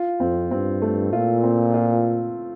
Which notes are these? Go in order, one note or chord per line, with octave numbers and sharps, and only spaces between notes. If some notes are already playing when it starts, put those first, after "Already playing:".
Already playing: F4
F2 C4
G2 C4
A3
A#2 F4
C4
F4